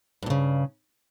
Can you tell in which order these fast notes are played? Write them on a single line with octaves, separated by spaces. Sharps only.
G2 A#2 C#3